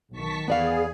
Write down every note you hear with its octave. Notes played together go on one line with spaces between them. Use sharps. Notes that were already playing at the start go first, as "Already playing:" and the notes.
B1 D#3 A5 C#6 B6
E2 B3 G#4 D5 F5